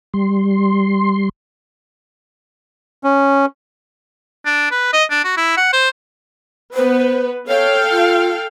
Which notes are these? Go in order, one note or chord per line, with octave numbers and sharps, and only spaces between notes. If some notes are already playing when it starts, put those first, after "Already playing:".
G3 C6
C#4
D4
B4
D#5
D4
F#4
E4
F#5
C5
B3 B4 C5
A4 C#5 F5 G5
F4